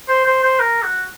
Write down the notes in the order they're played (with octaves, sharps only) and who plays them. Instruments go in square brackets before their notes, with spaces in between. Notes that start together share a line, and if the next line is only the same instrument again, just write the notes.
[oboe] C5
C5
C5
A#4
F#4